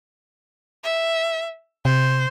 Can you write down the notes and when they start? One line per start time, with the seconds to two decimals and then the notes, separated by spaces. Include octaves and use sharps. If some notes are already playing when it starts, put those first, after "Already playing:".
0.84 E5
1.85 C3 C5